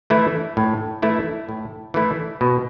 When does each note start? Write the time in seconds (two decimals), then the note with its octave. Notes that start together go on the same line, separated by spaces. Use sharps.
0.10 E3 A3 E4
0.57 A2
1.02 E3 A3 E4
1.49 A2
1.94 E3 A3 E4
2.41 B2